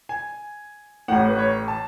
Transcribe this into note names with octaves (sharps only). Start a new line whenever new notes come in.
G#5
A1 A2 F#5
B4
C#5
A5